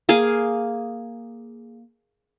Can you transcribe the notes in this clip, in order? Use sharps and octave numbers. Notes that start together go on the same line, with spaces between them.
A#3 G#4 F5